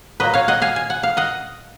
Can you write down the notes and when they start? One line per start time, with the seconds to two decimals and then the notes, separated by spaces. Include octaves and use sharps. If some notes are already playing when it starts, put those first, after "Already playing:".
0.20 A#2 F#3 B4 D#5
0.34 C#5 F5
0.48 D#5 F#5
0.62 F5 G#5
0.76 G#5
0.90 F#5
1.03 F5
1.17 D#5 F#5